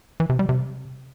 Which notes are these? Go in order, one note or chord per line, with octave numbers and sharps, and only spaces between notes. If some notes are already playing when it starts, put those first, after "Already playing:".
E3
C3
G3
C3